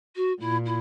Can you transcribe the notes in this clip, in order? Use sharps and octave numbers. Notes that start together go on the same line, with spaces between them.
F#4
A#2 E4
E4